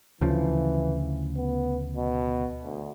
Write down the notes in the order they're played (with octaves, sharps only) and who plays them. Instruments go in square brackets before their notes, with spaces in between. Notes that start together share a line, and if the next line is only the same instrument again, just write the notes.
[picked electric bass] D2 C#3 F3 [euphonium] E3
[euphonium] B3
B2
D2